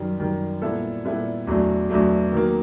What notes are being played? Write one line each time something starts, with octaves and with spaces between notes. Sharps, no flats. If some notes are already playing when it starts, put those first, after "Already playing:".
Already playing: F#2 D#3 G3
F#2 D#3 G3
A#2 G3 B3 E4 A4
A#2 G3 B3 E4 A4
E2 B2 F#3 A3 D4
E2 B2 F#3 A3 D4
D#3 F#3 A#3